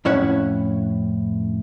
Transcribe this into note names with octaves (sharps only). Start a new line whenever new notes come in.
F2 A2 C#4 E4 C#5 F#5